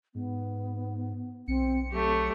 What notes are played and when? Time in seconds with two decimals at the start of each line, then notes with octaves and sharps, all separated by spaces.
0.15 G#2 B3
1.48 B1 C4 C#7
1.92 F#3 A3 G4